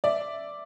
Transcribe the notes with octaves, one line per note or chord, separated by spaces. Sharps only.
D5 E5